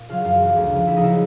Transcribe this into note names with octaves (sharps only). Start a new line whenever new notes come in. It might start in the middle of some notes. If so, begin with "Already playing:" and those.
Already playing: A#2
C#3 F#3 F4
F#2 F4
C#3 E3
D2
C#3 F3
D2 E4
D#4
C#3 F#3 E4